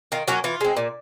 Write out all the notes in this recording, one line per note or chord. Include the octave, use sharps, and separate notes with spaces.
D#3 F4
F#3 A#3 C#4 F#4
E3 F4
G#3 C4
A#2